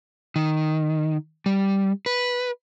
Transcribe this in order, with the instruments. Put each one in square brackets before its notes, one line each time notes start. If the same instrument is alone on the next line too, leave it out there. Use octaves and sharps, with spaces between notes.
[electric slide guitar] D#3
G3
B4